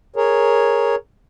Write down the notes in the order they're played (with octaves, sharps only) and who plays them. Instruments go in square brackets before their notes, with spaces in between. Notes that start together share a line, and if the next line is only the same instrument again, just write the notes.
[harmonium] G#4 A#4 C#5